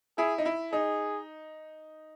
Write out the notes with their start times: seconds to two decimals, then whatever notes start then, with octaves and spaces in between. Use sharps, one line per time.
0.18 E4 G#4
0.38 D#4
0.45 E4
0.72 D#4 G#4